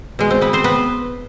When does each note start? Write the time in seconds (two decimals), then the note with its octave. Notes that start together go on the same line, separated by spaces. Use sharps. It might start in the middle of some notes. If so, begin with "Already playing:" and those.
0.19 B2 G#3
0.30 C4
0.41 B3 B4
0.53 C4 C5
0.64 B3 B4